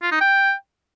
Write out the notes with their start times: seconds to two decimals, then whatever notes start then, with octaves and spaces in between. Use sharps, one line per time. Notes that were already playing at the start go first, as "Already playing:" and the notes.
0.02 F4
0.11 D#4
0.21 G5